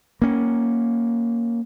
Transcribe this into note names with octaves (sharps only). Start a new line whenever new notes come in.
A#3 C#4